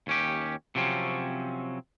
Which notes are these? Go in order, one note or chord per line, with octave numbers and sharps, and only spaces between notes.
D#2 C#4 G4
C3 F3 F#3 C4 C#4